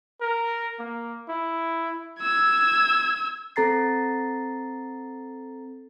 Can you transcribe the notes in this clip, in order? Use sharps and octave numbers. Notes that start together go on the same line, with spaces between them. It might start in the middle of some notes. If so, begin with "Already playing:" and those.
A#4
A#3
E4
E6 G#6
C4 A4 A#5 A6 C7